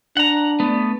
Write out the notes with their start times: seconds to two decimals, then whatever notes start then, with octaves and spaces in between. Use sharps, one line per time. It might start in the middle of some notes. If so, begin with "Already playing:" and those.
0.17 D4 F#5 A#5
0.60 A3 B3